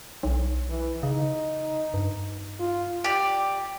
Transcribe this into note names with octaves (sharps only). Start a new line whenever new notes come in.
B1
E3
C#3 D#4
G2
F4
G4 D5